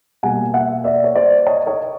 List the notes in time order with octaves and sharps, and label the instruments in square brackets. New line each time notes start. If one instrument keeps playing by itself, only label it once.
[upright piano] B2 G3 A#3 F#5 G#5
E5 F#5
D5 E5
C#5
C5 D5
C#5 D#5
C#5 D#5